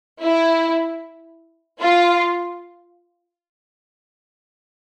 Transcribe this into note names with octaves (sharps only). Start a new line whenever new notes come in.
E4
F4